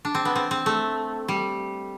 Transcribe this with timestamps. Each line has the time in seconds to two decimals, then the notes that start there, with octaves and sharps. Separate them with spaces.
0.05 D4
0.15 C4
0.25 B3
0.36 C4
0.51 C4
0.66 A3
1.28 G3